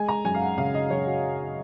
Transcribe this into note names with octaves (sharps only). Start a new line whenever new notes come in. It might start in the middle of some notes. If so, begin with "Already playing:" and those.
Already playing: G#3 G#5
A#5
F#2 G#5
F5
F#5
C#3 F5
D#5
F#2 C#5
F#4